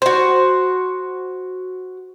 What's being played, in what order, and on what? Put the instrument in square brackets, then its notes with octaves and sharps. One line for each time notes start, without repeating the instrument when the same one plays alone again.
[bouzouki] F#4 C5